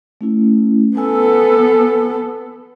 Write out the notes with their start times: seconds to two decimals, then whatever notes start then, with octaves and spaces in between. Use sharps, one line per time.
0.21 A3 C#4 E4
0.97 B3 A4 G#5 E6